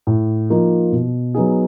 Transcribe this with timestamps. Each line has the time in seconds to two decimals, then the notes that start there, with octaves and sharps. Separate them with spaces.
0.07 A2
0.50 F3 A#3 D#4
0.92 B2
1.35 F#3 B3 D#4 G#4